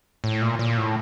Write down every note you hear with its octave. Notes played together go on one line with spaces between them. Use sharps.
A2
A#2
A#2
A2